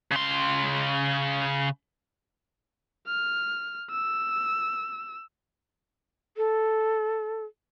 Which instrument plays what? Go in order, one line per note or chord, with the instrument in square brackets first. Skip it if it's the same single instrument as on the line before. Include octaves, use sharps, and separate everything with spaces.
[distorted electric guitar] C#3 C6
[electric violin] F6
E6
[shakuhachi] A4